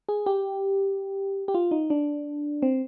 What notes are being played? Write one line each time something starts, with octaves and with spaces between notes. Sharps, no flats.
G#4
G4
G4
F4
D#4
D4
C4